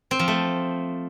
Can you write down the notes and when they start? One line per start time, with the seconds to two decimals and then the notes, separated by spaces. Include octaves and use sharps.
0.11 C4
0.19 F3
0.28 A3